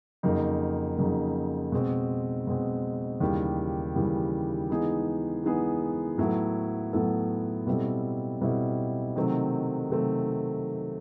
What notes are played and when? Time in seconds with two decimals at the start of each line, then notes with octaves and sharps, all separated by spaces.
0.23 F2 C#3 F#3 A#3 D#4
0.98 F2 C#3 F#3 A#3 D#4
1.72 B2 G#3 C4
2.47 B2 G#3 C4
3.20 D#2 C#3 E3 G3
3.96 D#2 C#3 E3 G3
4.70 E3 G#3 B3 D#4 G#4
5.44 E3 G#3 B3 D#4 G#4
6.18 A2 F#3 B3 E4 A4
6.93 A2 F#3 B3 E4 A4
7.67 B2 G3 C4 E4 A4
8.41 B2 G3 C4 E4 A4
9.16 C3 D#3 F#3 A3 C4
9.90 C3 D#3 F#3 A3 C4